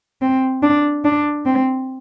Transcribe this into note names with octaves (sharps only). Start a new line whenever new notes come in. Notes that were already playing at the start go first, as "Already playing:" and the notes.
C4
D4
D4
C4